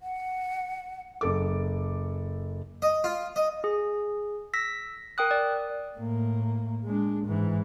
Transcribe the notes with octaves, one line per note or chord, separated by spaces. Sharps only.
F#5
F#1 A4 D6
D#5
F4
D#5
G#4
E6 A#6 B6
A#4 G5 D#6 F#6
D5
A2 A#3
G#3 D4
G#2 E3